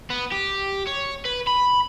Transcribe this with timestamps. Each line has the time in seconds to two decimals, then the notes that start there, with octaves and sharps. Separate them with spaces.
0.10 B3
0.32 G4
0.87 C#5
1.25 B4
1.47 B5